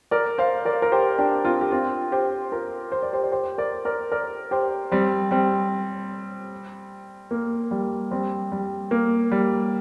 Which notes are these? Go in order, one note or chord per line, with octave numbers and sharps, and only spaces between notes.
A#4 D5
C5 F5
A#4 D5
A#4
G4 C5
D4 G4
C4 F4
G4
C4 F4
G4 C5
F4 A#4
C5
D5
G4 C5
D5
G4 C5
A#4 D5
A#4 D5
A#4 D5
G4 C5
G3 C4
G3 C4
A#3
G3
G3 C4
G3
A#3
G3